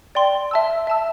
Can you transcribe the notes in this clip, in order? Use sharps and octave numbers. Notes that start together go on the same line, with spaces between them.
D5 G5 C6
E5 A5 E6
E5 A5 E6